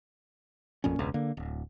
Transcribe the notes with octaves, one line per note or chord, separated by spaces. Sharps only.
A1 F2 A#2 C#4
E1 C#2
D3 A#3
D1